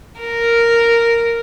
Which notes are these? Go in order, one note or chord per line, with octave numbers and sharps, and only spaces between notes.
A#4